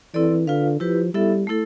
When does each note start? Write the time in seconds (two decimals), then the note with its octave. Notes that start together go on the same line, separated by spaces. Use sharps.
0.14 E3 C4 E4 A4 D5
0.47 D3 F4 B4 F5
0.80 F3 E4 G4 B4
1.14 G3 B3 E4 A4 E5
1.47 A3 E4 A4